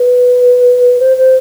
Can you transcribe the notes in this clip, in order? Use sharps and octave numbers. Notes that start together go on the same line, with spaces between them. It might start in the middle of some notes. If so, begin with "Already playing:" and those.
Already playing: B4
C5
C5